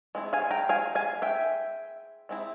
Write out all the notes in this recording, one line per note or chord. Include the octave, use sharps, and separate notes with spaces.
G#3 C4 E4
F5 G#5
G5 A#5
F5 G#5
F5 G#5
E5 G5
G#3 C4 E4